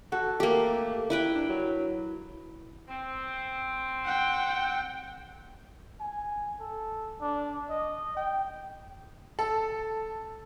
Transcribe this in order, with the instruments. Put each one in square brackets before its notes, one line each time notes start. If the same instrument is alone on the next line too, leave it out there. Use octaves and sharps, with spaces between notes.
[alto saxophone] F#4 [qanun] A4
[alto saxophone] A3 [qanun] A#3 G4
[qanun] E4 B4 G5
[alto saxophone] D4
F#3
[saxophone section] C4
[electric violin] F#5 G5
[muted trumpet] G#5
A4
D4
D#5
G5
[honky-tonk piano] A4